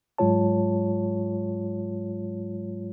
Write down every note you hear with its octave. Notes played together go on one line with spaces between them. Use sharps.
G#2 F#3 G#3 F4 C#5 A5